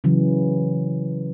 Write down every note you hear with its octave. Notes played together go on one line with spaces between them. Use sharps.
C#3 E3 F#3